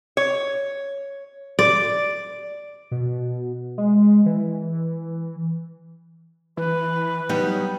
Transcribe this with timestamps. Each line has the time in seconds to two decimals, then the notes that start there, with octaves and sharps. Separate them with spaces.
0.17 C#5
1.59 D5
2.91 B2
3.78 G#3
4.26 E3
6.57 E3 B4
7.29 F#3 G3 B3 D#4